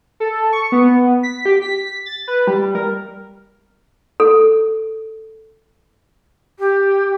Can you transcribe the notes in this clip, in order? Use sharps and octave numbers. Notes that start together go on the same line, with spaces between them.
A4
C#6
B3
B6
G4
B6
A6
B4
G3
A#4
A4
G4